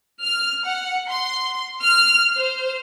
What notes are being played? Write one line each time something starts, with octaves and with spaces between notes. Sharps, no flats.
F6
F#5
C6
F6
C5